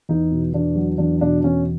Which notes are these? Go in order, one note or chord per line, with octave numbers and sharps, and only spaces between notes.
E2 D#4
B2
E2 D4
F#3
E2 D4
B2 D4
E2 C#4